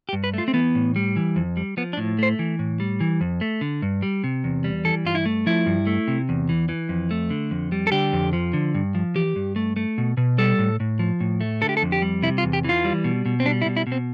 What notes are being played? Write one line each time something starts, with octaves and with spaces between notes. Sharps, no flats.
G4
G2
B4
A3 F4
C4
E3 B3
A2
G3
E3
F2
G3
F3 B3
D4
A2
A3 C5
E3
A2
G3
E3
F2
A3
D3
G2
G3
C3
E2
G3
E3 A4
G2 F4
E4
A3
F3 E4
G2
A3
C3
E2
E3
E3
F2
A3
D3
F2
G3
A4
D3 G4
F2
F3
D3
G2
F3
E3 G4
G2
A3
A3
B2
B2
G3 A4
A2
A2
F3
A2
A3
D3 A4
G4
A4
F2
G4
G3
C3 E4
F4
E2
G4
E3 F4
G3
B2
B2
C4
G3 D4
E4
B2
E4
B2
C4